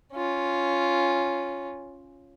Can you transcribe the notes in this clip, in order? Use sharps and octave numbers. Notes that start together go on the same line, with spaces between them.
C#4 F4